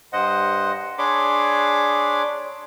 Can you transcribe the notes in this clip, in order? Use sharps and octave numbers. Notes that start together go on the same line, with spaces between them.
G2 C5 D#5 F#5
D4 G#4 C#5 B5 C6 D6